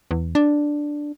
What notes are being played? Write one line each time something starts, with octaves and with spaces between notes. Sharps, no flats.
E2
D4